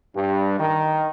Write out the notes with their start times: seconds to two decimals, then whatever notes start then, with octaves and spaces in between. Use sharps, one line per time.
0.15 G2
0.60 D#3